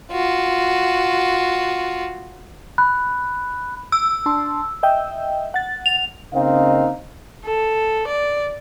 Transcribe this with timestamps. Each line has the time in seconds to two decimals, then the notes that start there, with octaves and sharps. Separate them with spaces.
0.11 F4 F#4
2.78 B5 F#6
3.92 E6
4.26 D4 A5 C6
4.83 D#5 E5 G5
5.54 F#5 A6
5.86 F7
6.33 C#3 A#3 C4 D#4 D#5 F5
7.45 A4
8.08 D5